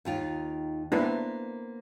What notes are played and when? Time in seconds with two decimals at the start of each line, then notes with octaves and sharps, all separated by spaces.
0.05 D#2 D#3 F4
0.92 A#3 B3 D4 E4 B4 C5